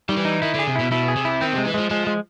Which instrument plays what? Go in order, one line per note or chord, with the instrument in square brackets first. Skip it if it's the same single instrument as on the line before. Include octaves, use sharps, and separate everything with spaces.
[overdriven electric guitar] D#3 [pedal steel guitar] G3
[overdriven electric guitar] E3
[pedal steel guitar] D#4
[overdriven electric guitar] D#3 [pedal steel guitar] E4
[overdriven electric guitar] D3 [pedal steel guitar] G#4
[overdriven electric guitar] C3
[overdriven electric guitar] B2 [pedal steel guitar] E4
[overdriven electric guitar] B2 [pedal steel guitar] E4
[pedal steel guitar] G#4
[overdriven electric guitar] C3
[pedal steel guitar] E4
[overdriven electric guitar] D#3 [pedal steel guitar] C4
[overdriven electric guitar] C3 [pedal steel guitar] G#3
[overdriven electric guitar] E3
[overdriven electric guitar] F3 [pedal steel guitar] G#3
[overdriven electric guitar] F3 [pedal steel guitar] G#3
[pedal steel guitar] G#3